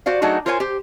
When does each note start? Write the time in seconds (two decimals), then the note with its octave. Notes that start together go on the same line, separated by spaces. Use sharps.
0.06 F#4 C5 D5 F5
0.22 F#3 A3 D4 D#4 F#4 G#4
0.46 F4 A#4 C5 C#5 E5 G#5
0.60 G4 C5